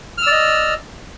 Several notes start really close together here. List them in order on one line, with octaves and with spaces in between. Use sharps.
F6 E6 D5 D#5